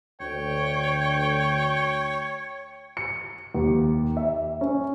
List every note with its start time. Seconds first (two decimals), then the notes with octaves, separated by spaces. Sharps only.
0.21 D2 C#5 G5
2.97 C#7
3.54 D#2
4.17 E5
4.61 C#4